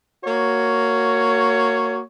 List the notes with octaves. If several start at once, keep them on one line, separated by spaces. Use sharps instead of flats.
A#3 F#4 C#5